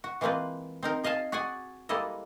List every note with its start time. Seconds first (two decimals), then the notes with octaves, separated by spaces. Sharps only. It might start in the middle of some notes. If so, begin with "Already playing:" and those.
0.04 F#4
0.21 E3 G#3 A#3 C4 F4 B4
0.83 C4 D#4 A#4
1.04 G#4 D#5 F5 G#5 A5
1.32 F#4 G#4 D5 F#5 G#5
1.89 G3 G#3 A#3 E4 A4 D#5